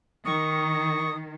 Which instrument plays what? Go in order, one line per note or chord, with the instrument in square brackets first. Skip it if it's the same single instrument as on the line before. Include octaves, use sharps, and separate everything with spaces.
[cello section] D#3 [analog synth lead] C#6 [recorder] D#6